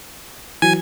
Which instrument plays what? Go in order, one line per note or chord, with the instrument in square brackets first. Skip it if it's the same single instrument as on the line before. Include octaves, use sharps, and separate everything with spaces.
[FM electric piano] E3 F#3 [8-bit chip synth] G#5